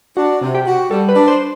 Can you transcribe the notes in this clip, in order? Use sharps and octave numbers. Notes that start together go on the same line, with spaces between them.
D4 F#4
C3
G4
F#4
G3 A4
B4
D4
C5